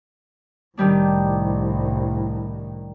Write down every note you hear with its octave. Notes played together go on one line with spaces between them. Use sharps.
C2 A2 D#3 G3 D4